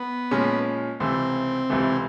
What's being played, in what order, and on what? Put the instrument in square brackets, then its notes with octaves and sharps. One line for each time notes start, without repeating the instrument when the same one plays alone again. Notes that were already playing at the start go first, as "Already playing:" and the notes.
Already playing: [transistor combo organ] B3
[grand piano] A#2 F3 G#3 C#4
[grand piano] C#2 C3 E3 A3 [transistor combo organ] C4
[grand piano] C#2 C3 E3 A3